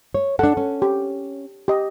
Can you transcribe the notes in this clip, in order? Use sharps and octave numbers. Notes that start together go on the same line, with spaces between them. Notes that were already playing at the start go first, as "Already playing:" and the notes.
C#5
D4 A4 F#5
C#4
G4
G4 D#5